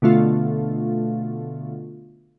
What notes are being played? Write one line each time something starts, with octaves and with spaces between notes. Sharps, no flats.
B2 D3 A3 F4